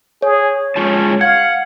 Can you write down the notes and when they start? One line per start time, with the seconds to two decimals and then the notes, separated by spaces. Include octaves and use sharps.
0.22 G#4 C#5
0.76 G#3 C#4 F4 A5
1.21 F5 F#5 G#6